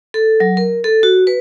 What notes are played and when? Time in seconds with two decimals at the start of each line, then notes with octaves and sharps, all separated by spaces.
0.14 A4
0.40 F#3
0.57 A#4
0.84 A4
1.03 F#4
1.27 B4